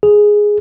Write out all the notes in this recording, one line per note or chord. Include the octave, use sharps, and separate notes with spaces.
G#4